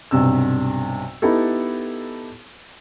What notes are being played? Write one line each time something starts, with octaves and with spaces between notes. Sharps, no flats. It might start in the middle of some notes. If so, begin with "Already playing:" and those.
B1 G2 C3 E6
B3 D#4 E4 G4 A4